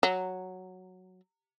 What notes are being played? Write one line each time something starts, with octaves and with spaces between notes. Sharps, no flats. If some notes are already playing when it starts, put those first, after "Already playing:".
F#3